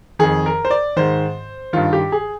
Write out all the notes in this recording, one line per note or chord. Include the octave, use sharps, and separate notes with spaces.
F2 D#3 G#4
A#4
C5
D5
G#2 D#3 C5
G2 D#3 F4
G4
G#4